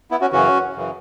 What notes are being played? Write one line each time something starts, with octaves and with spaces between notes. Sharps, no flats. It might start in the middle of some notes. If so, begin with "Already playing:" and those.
B3 E4
C#4 F#4
F#2 C#3 E3 C#4 F#4
F#2 C#3 E3